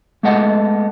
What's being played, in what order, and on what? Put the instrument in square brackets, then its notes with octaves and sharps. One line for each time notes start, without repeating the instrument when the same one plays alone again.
[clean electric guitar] G#3 A3 B3 A4 D#5 F#5